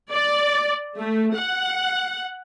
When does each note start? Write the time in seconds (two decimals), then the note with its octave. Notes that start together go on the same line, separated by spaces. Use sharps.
0.11 D5
0.98 A3
1.35 F#5